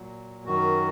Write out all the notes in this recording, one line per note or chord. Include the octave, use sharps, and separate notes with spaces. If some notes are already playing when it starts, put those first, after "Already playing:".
Already playing: A#2 F#3
F#2 D#3 F#3 F#4